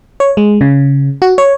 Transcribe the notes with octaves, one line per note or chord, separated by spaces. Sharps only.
C#5
G#3
C#3
F#4
C#5